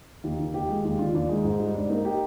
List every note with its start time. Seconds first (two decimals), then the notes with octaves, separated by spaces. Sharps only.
0.24 D#2 D#4 G4
0.39 D#3
0.54 D#2 D#4 G4
0.69 G#3
0.84 D#2 D#4 G4
0.99 D#3 D4 F4
1.14 D#2 D4 F4
1.29 G#3 D#4
1.44 G#2 D#4
1.59 G3 D#4
1.74 G#2 D4
1.89 A#3 D#4
2.05 D#4 G4